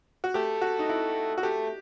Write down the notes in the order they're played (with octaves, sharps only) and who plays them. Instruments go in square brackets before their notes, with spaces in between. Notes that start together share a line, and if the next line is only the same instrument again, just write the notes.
[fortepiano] F#4
[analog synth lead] A3 [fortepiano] G4
[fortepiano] F#4
D#4
E4
F#4
[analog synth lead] A3 [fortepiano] G4